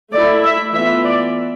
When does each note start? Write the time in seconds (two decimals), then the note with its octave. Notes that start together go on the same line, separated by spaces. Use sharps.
0.12 A3 E4 D5
0.44 E5
0.74 E3 B3 F4 E5
1.05 D5